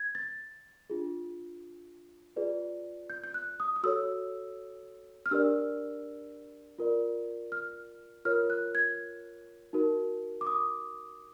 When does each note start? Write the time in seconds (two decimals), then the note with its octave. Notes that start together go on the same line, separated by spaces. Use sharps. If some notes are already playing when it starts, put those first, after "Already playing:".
Already playing: G#6
0.15 A6
0.90 D4 F4 G#4
2.36 F4 G#4 B4 D5
3.10 G6
3.24 G6
3.34 F#6
3.60 D#6
3.76 D#6
3.83 F#4 A4 C#5 E6
5.26 F6
5.31 D4 G4 A#4 D5 E6
6.79 F4 A#4 D5
7.52 F6
8.25 F4 A#4 C#5 F6
8.50 F#6
8.75 G#6
9.73 D#4 F#4 A#4
10.41 D6
10.47 D#6